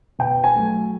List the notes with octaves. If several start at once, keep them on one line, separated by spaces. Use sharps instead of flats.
B2 G5
G#5
F#3 A3